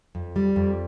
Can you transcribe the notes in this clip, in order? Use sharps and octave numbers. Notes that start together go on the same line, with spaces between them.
F2
G3
F2